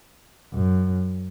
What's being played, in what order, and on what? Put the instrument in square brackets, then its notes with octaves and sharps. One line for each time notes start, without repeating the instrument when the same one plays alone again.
[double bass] F#2